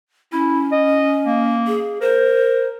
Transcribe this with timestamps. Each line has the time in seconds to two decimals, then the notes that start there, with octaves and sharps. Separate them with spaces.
0.32 C#4 E4
0.72 D#5
1.26 A#3
1.67 G#4
2.01 A#4 C5